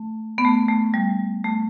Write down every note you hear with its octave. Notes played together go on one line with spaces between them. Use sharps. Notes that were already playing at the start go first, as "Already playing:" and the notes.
Already playing: A3
B3
A3
A3
G3
A3